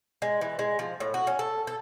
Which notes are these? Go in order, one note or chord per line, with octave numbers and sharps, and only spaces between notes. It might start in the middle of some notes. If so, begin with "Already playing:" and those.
G#3
E3
G#3
F3
A2
F#4
C#4
A4
A4